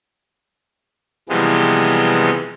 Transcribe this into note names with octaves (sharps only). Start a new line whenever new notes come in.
C3 E3 F3 G3 G#3 B3